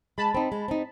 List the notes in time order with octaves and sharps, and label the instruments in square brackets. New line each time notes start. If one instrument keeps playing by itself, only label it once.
[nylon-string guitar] G#3 [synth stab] A5 B5
[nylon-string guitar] C4 D#4
G#3
C4 D#4